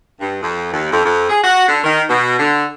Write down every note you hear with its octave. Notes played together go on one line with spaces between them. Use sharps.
G2
F2
D#2
F2
F2
G#4
F#4
D3
D#3
B2
D3